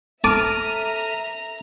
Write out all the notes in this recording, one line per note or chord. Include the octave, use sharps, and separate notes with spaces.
A4 E5 A5 A#5 D6 F6 D#7